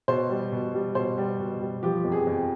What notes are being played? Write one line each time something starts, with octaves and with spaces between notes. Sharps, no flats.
B2 C5
G3
B2
G3
B2 C5
G3
B2
G3
F3 G4
F2
G#4
F2